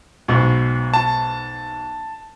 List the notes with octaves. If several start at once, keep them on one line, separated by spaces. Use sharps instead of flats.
B1 G#2 B2
A5